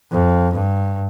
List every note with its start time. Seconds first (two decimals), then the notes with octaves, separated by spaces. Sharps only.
0.12 F2
0.54 G2